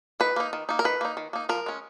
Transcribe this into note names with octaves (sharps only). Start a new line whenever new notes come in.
D#3 B4
A#3 D#4
D#3
A#3 D#4
A#4
D#3 B4
A#3 D#4
D#3
A#3 D#4
F3 A#4
G#3 C#4